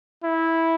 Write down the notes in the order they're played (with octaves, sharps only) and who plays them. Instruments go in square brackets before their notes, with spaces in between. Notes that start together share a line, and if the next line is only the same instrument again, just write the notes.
[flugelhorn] E4